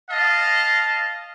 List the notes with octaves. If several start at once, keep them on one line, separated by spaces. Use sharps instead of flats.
D#5 F5 A5